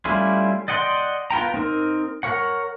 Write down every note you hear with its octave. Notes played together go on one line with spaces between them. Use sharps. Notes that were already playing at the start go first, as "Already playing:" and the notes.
G3 A3 C#4 E4 F4
D5 D#5 F#5 G5 C6
B3 F4 G5 A#5
C4 D#4 A#4
A#4 C#5 F#5